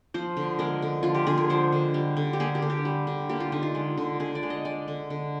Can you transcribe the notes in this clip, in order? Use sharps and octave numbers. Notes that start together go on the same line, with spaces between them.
F3 C5
D3
G#3 A#4
D3
F3 F4
G4
D3 G#4
A#4
G#3 C5
D3
G3
D3
G4
A#3 G#4
G4
D3
G4
G3
D3
A#3 G4
F4
D3 D#4
F4
G#3
D3
D3 G#4
D5
G#3
D#5
G#3 D5
D3
D3